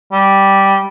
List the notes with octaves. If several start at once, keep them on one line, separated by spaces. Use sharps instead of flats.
G3